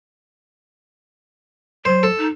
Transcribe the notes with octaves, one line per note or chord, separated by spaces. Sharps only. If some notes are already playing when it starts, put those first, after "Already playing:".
F#3 C5
A4
D#4